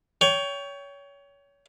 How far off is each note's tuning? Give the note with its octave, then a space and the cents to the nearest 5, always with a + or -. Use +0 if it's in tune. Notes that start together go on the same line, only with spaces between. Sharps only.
C#5 +25 G5 +0